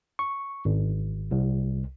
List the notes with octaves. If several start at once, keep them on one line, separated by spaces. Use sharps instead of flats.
C#6
G#1
C2